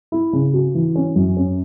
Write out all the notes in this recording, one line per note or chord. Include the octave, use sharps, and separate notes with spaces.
E4
C#3
F#4
E3
C#4
F#2
C#4